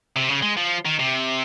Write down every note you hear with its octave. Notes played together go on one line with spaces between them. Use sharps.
C3
C#3
G#3
F3
D#3
C3